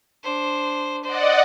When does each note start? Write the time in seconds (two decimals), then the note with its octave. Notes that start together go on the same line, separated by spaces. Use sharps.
0.23 D4 C5
1.04 C5 D5 D#5 F#5